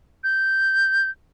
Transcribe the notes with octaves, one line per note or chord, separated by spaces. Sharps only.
G6